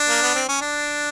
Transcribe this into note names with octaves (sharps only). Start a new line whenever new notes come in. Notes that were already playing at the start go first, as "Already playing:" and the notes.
Already playing: D4
A#3
B3
C4
C#4
D4